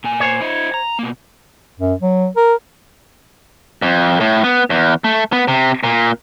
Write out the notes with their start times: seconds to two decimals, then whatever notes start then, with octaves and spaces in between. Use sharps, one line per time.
0.04 A#2 G#5
0.20 C5 C#5
0.41 E4 D#5
0.74 A#5
0.99 B2 A#3
1.79 F#2
2.02 F#3
2.36 A#4
3.82 F2
4.20 A2
4.44 B3
4.70 E2
5.04 A3
5.33 B3
5.48 C3
5.84 A#2